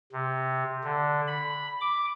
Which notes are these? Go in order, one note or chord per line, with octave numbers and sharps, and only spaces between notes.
C3
D3
B5
D6